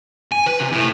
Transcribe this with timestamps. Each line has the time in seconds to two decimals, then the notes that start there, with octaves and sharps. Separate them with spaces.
0.32 G#5
0.47 B4
0.60 C3
0.71 A2